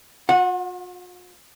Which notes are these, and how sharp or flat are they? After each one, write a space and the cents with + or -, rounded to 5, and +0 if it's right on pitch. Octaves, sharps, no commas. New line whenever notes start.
F4 +45 F#5 -20